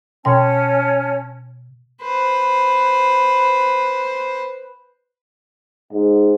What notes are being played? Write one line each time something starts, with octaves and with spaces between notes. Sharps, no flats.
B2 C#4 C#5 G5 A5
B4 C5
G#2